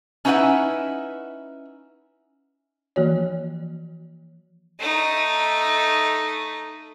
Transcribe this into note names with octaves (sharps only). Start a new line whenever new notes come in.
C#4 D#4 E4 B4 F#5 G#5
E3 F3 A#3 F#4 C#5
A3 D#4